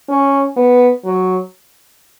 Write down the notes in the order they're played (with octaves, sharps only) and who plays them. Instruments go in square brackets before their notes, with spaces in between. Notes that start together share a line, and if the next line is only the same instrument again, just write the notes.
[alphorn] C#4
B3
F#3